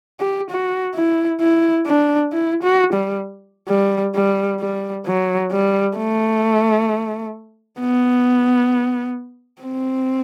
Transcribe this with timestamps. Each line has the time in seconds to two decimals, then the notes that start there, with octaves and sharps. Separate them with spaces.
0.20 G4
0.51 F#4
0.95 E4
1.41 E4
1.87 D4
2.33 E4
2.63 F#4
2.93 G3
3.69 G3
4.15 G3
4.61 G3
5.06 F#3
5.52 G3
5.98 A3
7.80 B3
9.62 C4